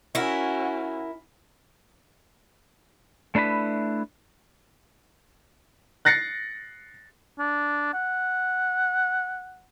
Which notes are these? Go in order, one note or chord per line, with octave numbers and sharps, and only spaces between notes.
C#4 E4 F#4 A#4
A3 D4 E4 B4 B5
F#6 A6 A#6 C7 C#7
D4
F#5